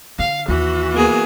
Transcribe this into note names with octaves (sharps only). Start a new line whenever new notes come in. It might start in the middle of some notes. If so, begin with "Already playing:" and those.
D3 F5
D#2 E3 F#4
A#3 B3 G#4